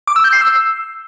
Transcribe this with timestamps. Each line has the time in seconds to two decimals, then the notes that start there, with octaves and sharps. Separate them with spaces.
0.07 D6
0.16 E6
0.24 G6
0.33 C7
0.41 E6